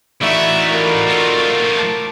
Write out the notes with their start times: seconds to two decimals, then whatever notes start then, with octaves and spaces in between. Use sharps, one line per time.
0.22 E3 A3 D#4 F#4 D5 E5
0.70 F4 A#4
1.07 F3 A3
1.78 A5 D6